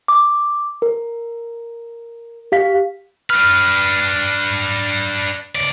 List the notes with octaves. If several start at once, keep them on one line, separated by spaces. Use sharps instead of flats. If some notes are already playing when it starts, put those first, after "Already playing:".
D6
A#4
G4 F5 B6
D4 B4 F6
C#2 D5